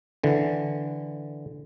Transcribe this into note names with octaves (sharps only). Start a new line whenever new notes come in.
D3 E3